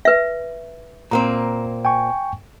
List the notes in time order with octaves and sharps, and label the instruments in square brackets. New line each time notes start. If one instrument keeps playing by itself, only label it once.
[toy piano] B4 E5
[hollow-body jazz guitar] A#2 A#3 C4 [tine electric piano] A#5
[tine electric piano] G5 G#5 C#6